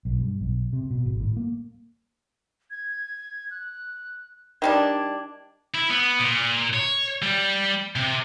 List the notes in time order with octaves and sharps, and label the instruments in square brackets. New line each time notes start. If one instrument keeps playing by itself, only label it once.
[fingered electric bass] B1
G2
B1
C3
B2
G#1
A2
A#3
[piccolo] G#6
F#6
[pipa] D#3 G3 D4 [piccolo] G#6
[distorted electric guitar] E4
B3
A#2
C#5
G3
C3